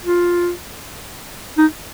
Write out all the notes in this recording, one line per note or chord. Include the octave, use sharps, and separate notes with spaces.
F4
D#4